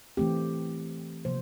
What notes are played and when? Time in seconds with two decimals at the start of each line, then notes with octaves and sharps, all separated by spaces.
0.17 E3 A3 C4 G4
1.25 C3 F3 A#3 C5